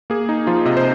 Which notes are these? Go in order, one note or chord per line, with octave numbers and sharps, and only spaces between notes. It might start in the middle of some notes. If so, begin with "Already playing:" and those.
A#3 G#4
D#4
F3 F4
C3 D#5
C5